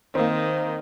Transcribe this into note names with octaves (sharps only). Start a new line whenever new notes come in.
D#3 A#3 C4